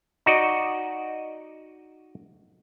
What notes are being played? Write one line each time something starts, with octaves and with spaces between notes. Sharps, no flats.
D#4 F#4 D5 D#5